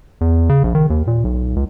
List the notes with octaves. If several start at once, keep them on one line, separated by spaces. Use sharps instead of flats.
E2
C#3
A#1
D#3
D#2
A#2
B1
C#2